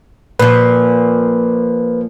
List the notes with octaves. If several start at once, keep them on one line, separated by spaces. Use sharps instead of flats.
A#2 F3 B4